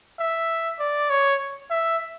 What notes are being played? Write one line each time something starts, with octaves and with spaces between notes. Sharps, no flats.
E5
D5
C#5
E5